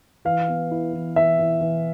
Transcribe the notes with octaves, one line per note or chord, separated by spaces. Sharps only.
E3 F5
B3
E4
E3
E3 E5
E3
E3